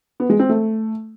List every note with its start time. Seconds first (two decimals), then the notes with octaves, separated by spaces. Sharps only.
0.20 B3
0.30 G#3
0.39 C4
0.49 A3